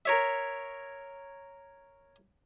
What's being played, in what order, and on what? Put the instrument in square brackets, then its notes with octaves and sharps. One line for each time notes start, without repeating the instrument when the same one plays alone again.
[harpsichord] A#4 C#5 E5